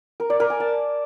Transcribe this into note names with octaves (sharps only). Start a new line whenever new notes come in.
A#4
D5
A#4
G#5
A5